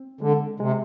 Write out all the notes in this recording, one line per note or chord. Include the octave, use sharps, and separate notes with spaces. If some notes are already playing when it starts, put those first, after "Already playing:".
Already playing: C4
D3 G#3
C3 G#3